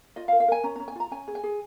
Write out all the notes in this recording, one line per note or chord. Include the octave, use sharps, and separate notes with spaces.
F4 D#5
F5
A#4
F5
A#4 G#5
C#4 A#5
C#4 A#5
G#5
F4 A#5
C#4 G#5
G#4
G#5
G#4